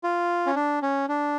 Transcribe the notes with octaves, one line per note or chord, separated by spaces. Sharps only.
F4
C#4
D4
C#4
D4